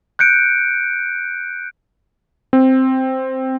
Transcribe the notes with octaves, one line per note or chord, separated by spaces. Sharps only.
F#6 G6 C#7 D7
C4